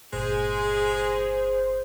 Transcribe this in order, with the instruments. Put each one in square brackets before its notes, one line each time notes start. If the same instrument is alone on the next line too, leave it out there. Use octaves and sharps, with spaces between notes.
[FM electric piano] G1 A#2 [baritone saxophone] G#3 [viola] G#4 [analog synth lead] C5